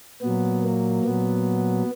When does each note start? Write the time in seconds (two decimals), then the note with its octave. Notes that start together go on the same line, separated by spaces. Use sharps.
0.21 A#2 F#3 B3
0.63 A#3
1.04 A#2 F#3 B3